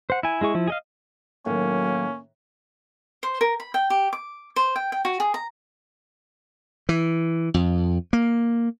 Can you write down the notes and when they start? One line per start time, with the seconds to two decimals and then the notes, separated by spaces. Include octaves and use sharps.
0.10 C5 F#5
0.23 E4 G#5
0.41 G#3 E4 G#4 C#6
0.55 F3 E4
0.68 G#4 D#5 F5
1.46 A2 D#3 F#3 A#3 C#4
3.23 C5
3.41 A#4
3.60 B5
3.74 G5
3.90 G4
4.13 D6
4.56 C5
4.76 G5
4.92 G5
5.05 F#4
5.20 G#4
5.34 A#5
6.89 E3
7.54 F2
8.13 A#3